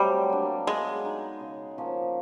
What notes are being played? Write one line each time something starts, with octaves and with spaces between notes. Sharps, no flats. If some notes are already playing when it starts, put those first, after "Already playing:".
Already playing: F#3 G3 A3 C4
A#3 D4
G#3 B3
D#4 G#4
C#3
F3 A#3 C#4